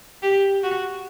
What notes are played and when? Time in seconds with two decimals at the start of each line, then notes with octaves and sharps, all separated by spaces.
0.22 G4
0.63 F#4